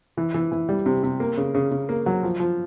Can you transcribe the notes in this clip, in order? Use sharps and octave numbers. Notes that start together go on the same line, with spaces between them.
E3
E3
E3
G3
C3
C3
A#3
C#3
C#3
C#3
A#3
F#3
F3
F3